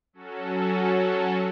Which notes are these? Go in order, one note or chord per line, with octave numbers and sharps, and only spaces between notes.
F#3 C#4 F#4 A4